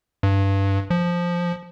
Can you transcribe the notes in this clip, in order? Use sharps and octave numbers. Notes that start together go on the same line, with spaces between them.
G2
F3